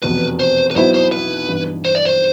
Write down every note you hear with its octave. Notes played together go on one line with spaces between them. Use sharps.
F1 E2 B2 B3 B4
C5
B4
B1 B2 B3 E4 C5
C5
B4
G2 E3 B3
C5
D5
C5